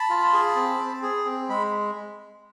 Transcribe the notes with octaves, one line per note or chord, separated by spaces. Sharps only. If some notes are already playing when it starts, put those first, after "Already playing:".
Already playing: A5 B5
F4
G#4
C4
C4
G#4
C4
G#3 B5